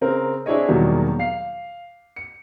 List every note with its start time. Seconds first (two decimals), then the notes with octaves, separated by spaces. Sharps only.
0.01 C#3 C4 A#4
0.46 C4 D4 E4 G#4 C#5 D#5
0.68 E2 B2 D#3 F#3 G3 A#3
1.19 F5 C7
2.16 C#7